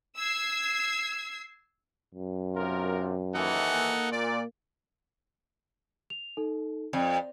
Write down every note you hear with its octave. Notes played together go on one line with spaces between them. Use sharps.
E6 G#6 C7
F#2
B1 C3 F4 A#4
D#2 E3 D#4 A4 F#5
A#3
A#2 D5
F7
D#4 A4
F2 D5